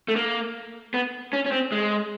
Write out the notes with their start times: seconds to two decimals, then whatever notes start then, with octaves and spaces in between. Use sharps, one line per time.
0.08 A3
0.16 A#3
0.94 B3
1.33 C#4
1.46 C#4
1.52 C4
1.72 G#3